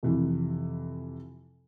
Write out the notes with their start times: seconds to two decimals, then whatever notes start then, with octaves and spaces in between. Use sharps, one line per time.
0.03 F2 C3 E3